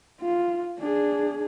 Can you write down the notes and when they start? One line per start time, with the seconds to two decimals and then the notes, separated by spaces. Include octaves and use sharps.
0.21 F4
0.79 D4 G#4